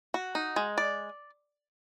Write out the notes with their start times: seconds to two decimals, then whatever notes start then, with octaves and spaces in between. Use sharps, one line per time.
0.14 F#4
0.35 D#4
0.56 G#3
0.78 D5